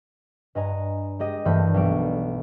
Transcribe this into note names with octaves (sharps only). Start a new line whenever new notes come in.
G2 B4 D#5 G#5 A#5
G#3 G4 G#4 D#5
G2 E3 A3 A#3 B5 G6
B1 F#3 G3 B3 D7